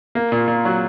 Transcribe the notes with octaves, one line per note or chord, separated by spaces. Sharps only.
A#3
A#2
A#2
F#3